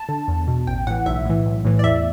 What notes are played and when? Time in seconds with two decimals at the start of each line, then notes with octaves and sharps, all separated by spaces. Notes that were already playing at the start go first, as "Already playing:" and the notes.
Already playing: A5
0.09 D3
0.28 E2
0.47 B2
0.67 A1 G5
0.87 A2 E3 F#5
1.06 B1 E5
1.25 A2 E3
1.45 B1
1.65 A2 E3
1.79 D5
1.84 E2 E5